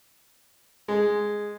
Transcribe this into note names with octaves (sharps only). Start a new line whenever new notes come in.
G#3